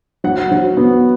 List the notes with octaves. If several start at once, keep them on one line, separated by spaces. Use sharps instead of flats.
F#3 F#5
F#3
B3